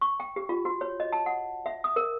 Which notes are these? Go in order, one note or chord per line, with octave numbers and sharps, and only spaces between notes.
C#6
G5
G4
F4
F#4
C#5
D#5
A5
F#5
E5
D#6
A#4